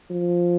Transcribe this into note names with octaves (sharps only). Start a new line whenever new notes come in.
F3